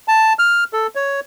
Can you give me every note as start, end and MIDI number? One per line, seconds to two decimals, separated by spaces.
0.08 0.33 81
0.39 0.64 89
0.73 0.87 69
0.95 1.20 73